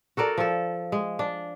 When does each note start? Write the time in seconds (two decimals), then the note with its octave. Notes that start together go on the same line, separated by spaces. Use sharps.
0.17 F#4 A4 A#4 D5
0.38 F3 A4
0.92 G#3
1.19 D4